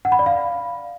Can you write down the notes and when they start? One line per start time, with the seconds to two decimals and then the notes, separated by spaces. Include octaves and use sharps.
0.05 F#5
0.12 B5
0.19 D5
0.26 F5